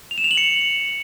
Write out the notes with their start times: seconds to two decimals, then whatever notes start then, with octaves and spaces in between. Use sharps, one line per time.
0.11 F7
0.18 E7
0.24 F7
0.31 F#7
0.37 C#7